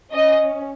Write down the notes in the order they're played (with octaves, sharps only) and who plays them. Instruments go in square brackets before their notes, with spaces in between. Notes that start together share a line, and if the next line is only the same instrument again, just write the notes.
[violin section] C#4 D#5